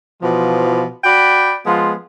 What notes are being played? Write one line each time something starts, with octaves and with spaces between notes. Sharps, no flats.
B2 E3 F3
F#4 D5 G5 B5
F3 G#3 B3 F4